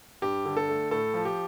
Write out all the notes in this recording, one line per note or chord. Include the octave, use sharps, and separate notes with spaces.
G2 G4
D3
A4
A3
A2 A4
F3
G4